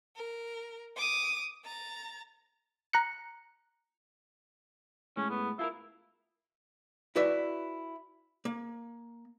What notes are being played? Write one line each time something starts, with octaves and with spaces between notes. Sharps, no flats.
A#4
D6 D#6
A#5 A6
A#5 F#6 C#7
A2 G#3 C#4
B3
E4 F4 A4 A#4
E4 F#4 B4 D5 E5
A#3